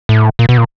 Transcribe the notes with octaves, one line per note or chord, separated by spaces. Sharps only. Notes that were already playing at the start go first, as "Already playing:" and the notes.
A2
A#2
B2
A#2